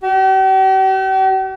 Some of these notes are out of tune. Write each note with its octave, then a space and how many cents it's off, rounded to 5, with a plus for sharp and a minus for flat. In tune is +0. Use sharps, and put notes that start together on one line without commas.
G4 -45